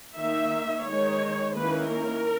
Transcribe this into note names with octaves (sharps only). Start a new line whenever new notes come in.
D#3 A#3 D#4 E5
D#3 G#3 D#4 C#5
D#3 A#3 C#4 E4 B4
A#4